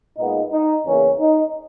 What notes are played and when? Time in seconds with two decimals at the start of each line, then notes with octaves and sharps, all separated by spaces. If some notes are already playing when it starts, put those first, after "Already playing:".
0.17 A#2 G#3 B3 D#4
0.51 D#4
0.85 E2 C#3 E3 A#3 C#4
1.19 D#4